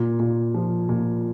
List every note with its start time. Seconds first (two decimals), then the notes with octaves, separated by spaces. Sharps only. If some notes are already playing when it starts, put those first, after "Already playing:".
Already playing: A#2
0.20 A#2
0.54 F3
0.89 A#2